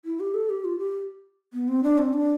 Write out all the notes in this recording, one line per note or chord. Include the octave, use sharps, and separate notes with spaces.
E4
G4
A4
G4
F4
G4
B3
C4
D4
C4
D4